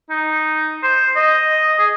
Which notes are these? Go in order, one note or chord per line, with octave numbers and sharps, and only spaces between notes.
D#4
C5
D#5
G#4